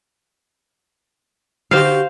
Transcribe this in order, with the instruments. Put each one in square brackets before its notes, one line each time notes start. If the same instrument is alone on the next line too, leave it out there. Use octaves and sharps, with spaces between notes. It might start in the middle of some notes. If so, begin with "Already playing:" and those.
[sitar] D3 F#4 G4 [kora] C5 F5